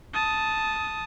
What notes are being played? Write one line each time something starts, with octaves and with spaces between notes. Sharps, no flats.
A5 D#6